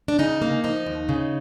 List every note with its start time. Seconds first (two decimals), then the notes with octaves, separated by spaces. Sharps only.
0.08 D4
0.19 C#3 D#4
0.42 A#3
0.64 F3 D#4
0.86 D#2
1.09 C#3